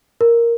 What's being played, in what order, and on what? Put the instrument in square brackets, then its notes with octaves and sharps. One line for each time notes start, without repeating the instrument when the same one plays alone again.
[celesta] A#4